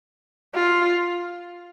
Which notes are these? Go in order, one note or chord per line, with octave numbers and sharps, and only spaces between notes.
F4